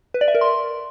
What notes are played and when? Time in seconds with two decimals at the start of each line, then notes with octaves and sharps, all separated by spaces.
0.14 B4
0.21 D5
0.28 E5
0.35 A#4
0.41 C6